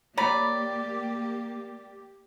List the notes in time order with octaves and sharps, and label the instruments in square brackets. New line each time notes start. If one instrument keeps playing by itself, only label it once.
[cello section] A#3 G4 [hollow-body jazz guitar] C#5 A#5 B5 [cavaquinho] D5